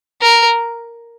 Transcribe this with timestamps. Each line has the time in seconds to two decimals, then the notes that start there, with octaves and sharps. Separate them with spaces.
0.22 A#4